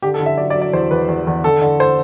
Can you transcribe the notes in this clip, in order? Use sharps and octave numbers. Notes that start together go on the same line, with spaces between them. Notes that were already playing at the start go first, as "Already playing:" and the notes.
D3 G4
A4
D3
E5
F#3 D5
D5
F#3
D5
E2 C5
E2 B4
E2
E2
D3 A4
D3
C5